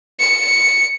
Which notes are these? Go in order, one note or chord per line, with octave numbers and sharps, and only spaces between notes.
C#7